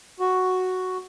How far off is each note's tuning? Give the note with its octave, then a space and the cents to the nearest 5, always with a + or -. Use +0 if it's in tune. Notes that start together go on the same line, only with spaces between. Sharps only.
F#4 +0